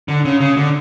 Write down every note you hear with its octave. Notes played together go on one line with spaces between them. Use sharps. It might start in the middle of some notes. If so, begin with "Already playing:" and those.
D3
C#3
C#3
D3